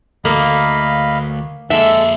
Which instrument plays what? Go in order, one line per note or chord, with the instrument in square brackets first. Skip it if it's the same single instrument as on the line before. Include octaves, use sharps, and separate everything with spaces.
[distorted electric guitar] D2 [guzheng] A#3 [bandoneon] D#5 F5 B5
[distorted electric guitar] F2 A#3 [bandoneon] G#3 A4 [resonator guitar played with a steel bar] E5